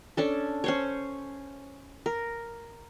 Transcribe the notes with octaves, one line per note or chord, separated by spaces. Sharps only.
C#4 D4 A4
C#4 C5 C#5
A#4